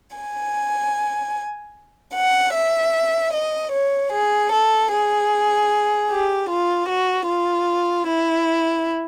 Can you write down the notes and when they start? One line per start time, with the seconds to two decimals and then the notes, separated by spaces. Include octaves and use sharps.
0.16 G#5
2.15 F#5
2.53 E5
3.32 D#5
3.72 C#5
4.11 G#4
4.52 A4
4.91 G#4
6.10 G4
6.49 F4
6.88 F#4
7.28 F4
8.07 E4